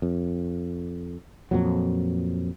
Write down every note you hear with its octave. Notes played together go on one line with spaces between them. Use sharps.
F2
F2 A#2 F#3